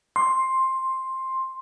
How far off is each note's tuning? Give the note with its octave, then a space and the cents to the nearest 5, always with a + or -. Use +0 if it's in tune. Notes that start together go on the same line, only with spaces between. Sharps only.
C6 +10